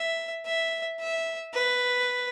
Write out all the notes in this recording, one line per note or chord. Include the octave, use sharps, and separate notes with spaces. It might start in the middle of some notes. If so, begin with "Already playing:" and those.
Already playing: E5
E5
E5
B4